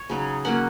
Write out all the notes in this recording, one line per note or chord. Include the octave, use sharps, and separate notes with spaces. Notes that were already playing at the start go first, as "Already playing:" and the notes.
Already playing: C#5
C#3 F#3 D#4
F#3 A#3 C#4 F#5